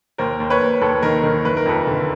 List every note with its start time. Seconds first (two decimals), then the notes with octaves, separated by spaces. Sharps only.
0.18 D#2 A#4 C5
0.40 D#2
0.50 B4 C#5
0.61 D#2
0.81 D#2 A4 B4
1.02 D#3 A#4
1.23 D#3 A#4
1.45 F#1 B4
1.57 A#4
1.65 F2 A4 B4
1.87 D3